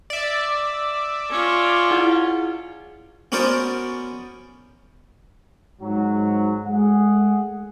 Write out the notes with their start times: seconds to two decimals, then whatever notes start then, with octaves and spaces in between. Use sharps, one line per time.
0.10 D5 E5
1.30 C#4 F4
1.91 E4 G#4 F#5
3.32 B3 C#4 F#4 A#4 C5 D5
5.81 G#2 F#3
6.65 G#3 A3 G#4 F#5